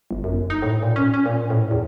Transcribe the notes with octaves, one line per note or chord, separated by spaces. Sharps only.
G1
F#2
D#4
A2
A#2
C#4
C#4
A#2
A2
E2